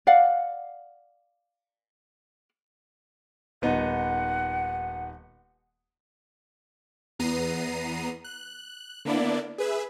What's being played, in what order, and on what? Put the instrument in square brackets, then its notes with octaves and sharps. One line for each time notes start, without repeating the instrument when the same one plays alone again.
[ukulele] D5 F5 F#5
[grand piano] D#1 B3 D#4 [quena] F#5
[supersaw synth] E2 B3 A#5 C7 D#7
F#6
D3 A#3 B3 D4 E4 D5
G#4 B4 E5